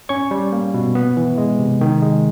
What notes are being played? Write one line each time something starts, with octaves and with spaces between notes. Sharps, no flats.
C#4 C#5 C#6
G3
A#3
B2
B3
E3
G#3
C3
D#3
G#3